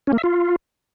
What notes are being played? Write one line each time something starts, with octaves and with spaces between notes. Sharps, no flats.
C#4
A#3
E5
F4